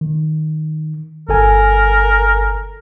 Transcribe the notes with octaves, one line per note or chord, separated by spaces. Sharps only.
D#3
G1 A4 A#4 G#5